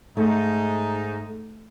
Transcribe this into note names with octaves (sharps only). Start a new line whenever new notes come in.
G#2 A3 D#4